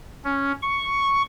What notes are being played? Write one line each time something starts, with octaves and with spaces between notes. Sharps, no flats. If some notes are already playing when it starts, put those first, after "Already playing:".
C#4
C#6